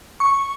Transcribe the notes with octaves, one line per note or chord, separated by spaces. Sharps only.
C#6